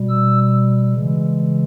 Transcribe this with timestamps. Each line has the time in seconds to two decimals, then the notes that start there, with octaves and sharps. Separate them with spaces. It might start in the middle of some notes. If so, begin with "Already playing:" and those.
Already playing: B2 G3
0.09 E6
0.94 C#3 E3 G#3